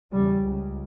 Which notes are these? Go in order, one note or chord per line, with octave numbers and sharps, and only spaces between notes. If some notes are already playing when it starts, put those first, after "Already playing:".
E2 C#3 G3
C#2 C#3